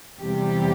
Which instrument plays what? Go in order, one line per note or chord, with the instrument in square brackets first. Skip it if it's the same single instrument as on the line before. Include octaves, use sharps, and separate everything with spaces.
[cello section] E2 C3 G3 G4